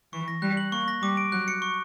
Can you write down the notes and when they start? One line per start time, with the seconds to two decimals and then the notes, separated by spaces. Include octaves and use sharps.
0.13 E3 C#6
0.28 A#6
0.42 G3 F#6
0.57 F#7
0.72 A#3 C#6
0.88 A#6
1.02 G3 D6
1.17 D7
1.32 F#3 F#6
1.48 C#7
1.62 C#6